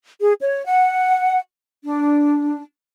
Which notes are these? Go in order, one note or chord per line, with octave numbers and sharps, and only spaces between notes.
G#4
C#5
F#5
D4